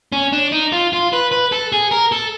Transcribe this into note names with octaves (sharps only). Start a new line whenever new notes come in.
C#4
D4
D#4
F4
F4
B4
B4
A4
G#4
A#4
A4